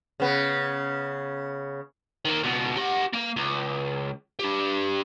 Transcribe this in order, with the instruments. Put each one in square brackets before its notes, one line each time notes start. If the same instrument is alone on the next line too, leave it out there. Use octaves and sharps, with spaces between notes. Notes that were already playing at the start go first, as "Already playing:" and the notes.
[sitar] C#3 B3
[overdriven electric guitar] D#3 A#3
C#2 B2
G4 F#5
A#3 F5
C#2
D4 G4